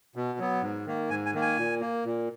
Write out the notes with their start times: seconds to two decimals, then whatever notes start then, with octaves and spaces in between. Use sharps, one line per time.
0.16 B2
0.39 F#3 B3
0.62 G#2
0.86 D#3 A#3
1.10 G#2 G#5
1.26 G#5
1.33 D#3 A#3
1.42 G#5
1.58 A#2
1.81 A#3
2.05 A#2